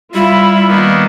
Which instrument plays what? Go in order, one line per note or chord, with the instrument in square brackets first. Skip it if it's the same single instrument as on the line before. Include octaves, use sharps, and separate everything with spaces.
[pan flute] G3 [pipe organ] E4 [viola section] F4 E5 B5
[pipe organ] D#3 A#3 B3